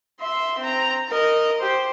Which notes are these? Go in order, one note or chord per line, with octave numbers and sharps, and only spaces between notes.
E5 C6
C4 A#5
A#4 D#5
G4 C5